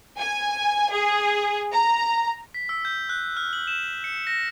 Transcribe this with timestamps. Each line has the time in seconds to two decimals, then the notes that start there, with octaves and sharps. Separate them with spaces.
0.19 G#5
0.91 G#4
1.72 A#5
2.54 B6
2.69 E6
2.85 G6
3.09 F#6
3.37 F6
3.53 F#7
3.67 E7
4.04 C#7
4.27 A#6